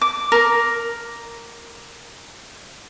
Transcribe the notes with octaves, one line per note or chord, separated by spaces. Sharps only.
D6
A#4